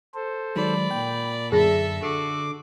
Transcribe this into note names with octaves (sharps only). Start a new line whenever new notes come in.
A4 C5
D#3 F#3 G#3 D5 B5
A#2 G5
F#2 D3 G#4 A4 E5 A#6
D3 F#4 A4 D6 E6 C7